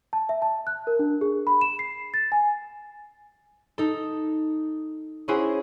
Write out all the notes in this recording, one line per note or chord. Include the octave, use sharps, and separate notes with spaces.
A5
E5
A5
F#6
A#4
D4
G#4
B5
E7
C7
A6
G#5
D#4 A4
C#4 E4 F#4 G#4 C5